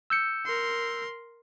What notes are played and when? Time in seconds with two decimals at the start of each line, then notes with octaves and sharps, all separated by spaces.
0.10 E6 G6 C#7
0.46 A#4 C6